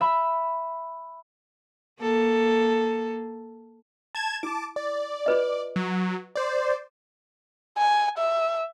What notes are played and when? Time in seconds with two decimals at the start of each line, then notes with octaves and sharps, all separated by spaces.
0.01 E5 B5
2.00 A#3 A4
4.15 A5 G#6 E7
4.43 E4 A5 D6
4.76 D5
5.26 F4 B4 D#5
5.76 F#3
6.36 C5 D5
7.78 G#5
8.18 E5